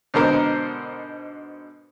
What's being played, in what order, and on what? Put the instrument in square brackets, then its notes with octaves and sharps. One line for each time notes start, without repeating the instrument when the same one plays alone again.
[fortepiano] G#2 B2 D3 A#4 C5